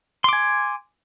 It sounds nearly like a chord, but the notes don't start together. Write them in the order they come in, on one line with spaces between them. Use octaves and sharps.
C6 D6 G#5